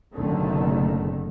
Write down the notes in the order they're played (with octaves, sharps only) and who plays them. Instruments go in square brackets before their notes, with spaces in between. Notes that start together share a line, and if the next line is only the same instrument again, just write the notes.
[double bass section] F#1 F#2 B2 D3 D#3 A3